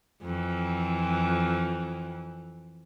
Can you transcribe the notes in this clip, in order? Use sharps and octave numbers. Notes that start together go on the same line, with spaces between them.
F2 E3